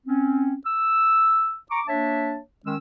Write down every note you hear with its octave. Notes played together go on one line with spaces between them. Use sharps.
C4 C#4
E6
A#5 C#6 D6
A#3 D4 C#5 E5 A5
D#3 G#3 C#4 E6